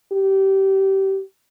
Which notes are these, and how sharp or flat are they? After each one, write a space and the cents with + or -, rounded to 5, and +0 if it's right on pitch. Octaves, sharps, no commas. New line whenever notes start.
G4 -20